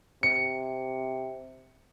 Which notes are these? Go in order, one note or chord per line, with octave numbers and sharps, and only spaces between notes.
C3 C#7